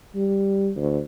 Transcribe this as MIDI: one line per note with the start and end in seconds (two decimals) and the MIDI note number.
0.15 0.71 55
0.76 1.00 38